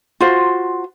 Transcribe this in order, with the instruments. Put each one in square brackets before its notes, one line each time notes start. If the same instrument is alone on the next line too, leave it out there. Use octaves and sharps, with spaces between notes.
[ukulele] F4 F#4 C5